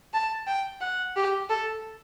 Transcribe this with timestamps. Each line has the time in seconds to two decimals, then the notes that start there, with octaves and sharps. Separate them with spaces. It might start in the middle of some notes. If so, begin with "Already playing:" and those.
0.14 A5
0.47 G5
0.81 F#5
1.16 G4
1.50 A4